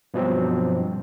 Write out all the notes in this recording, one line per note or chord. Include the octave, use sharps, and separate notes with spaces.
G2 B2 F3 F#3 C4